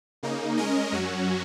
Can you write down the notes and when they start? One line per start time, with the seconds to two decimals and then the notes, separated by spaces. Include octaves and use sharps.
0.23 C#3 A#3 D#4
0.57 G#3 C#4 A#4 D#5
0.92 F#2 F#3 C#4 F#4